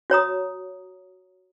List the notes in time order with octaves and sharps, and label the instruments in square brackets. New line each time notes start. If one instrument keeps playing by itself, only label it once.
[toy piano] F#4 C#5 A#5 D#6